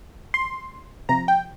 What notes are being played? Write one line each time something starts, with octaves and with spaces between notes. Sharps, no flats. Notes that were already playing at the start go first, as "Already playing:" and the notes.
C6
C3 F3 A#5
G5